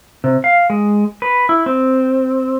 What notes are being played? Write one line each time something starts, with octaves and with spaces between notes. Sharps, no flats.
C3
F5
G#3
B4
E4
C4